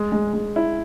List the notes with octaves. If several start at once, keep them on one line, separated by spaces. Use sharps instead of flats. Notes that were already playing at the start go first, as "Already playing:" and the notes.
Already playing: G#3
G#3
G#3
E4